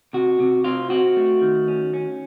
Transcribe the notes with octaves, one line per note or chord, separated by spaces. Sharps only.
C3 F#4
C3
C4 F4
C4 F#4
A3
D#3
C#4
C#4